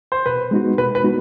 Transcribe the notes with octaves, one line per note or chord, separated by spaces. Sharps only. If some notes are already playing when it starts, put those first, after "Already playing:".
C5
B2 B4
G#3 B3 D#4 F#4
B2 B4
B4
G#3 B3 D#4 F#4